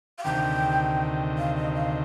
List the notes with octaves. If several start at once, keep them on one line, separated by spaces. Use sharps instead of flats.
F5
D2 C3 D#3 G5
F5
D#5
F5